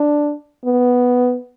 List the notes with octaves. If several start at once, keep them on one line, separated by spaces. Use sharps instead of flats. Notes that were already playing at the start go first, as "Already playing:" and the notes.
Already playing: D4
B3